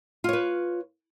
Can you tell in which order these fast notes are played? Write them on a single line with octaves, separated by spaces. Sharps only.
F4 C#5 B4